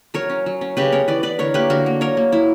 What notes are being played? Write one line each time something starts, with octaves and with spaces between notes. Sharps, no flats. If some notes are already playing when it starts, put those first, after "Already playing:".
F#3 A#4 C#5
C#4
F#3
C#4
C#3 G4 B4
B3 A#4 C#5
E3 B4 D5
E3 B4 D5
D3 A#4 C#5
A#3 G4 B4
D3 F#4 A#4
A#3
F#3 A#4 C#5
A#3
F#3 E4